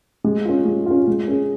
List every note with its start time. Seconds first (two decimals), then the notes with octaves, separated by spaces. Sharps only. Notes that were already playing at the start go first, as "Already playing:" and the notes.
0.24 G#3
0.45 C#4 F4
0.66 G#3
0.86 C#4 F4
1.08 G#3
1.28 C#4 G#4